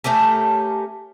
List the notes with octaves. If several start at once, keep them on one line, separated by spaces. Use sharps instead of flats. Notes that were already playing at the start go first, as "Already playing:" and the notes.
A3 C#4 G4 A#4